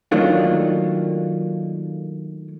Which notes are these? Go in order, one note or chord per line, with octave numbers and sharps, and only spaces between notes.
D#3 F#3 A3 A#3 D4 F4